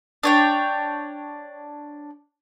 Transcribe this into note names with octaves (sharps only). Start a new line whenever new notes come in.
D4 C#5 G5